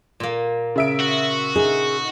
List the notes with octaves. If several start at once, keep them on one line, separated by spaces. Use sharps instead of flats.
A#2 A#3
C#3 E5 D7
F#4
D#4 G#4